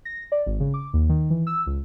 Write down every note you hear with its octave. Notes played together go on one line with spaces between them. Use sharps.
A#6
D5
G#1
C#3
D6
D#2
D#3
E3
E6
C#2